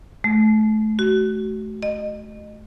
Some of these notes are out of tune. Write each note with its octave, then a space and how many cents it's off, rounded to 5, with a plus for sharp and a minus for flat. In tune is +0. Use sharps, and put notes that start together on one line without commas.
A3 -30
F#4 +30
D#5 -30